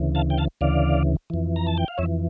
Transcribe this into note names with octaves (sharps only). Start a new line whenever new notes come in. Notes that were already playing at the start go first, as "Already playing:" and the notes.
Already playing: D2 C#3 E3
F5 A5
G5
F5 A5
D2 C#3 E3 D5 F5
F2 E3
A#5
A5
G5
F5
F2 C#5 E5
E3